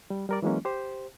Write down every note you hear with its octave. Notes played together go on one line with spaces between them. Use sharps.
G3
G3 A#4 D5
E3 F#3 G#3 A#3 C#4
G4 C5